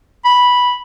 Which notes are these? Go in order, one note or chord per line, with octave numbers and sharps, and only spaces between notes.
B5